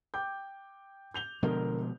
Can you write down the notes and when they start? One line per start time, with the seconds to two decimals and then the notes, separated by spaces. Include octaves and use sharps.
0.14 G5 D6 G6
1.14 G6 F7 G7
1.43 B2 D3 F3 G#3 A#4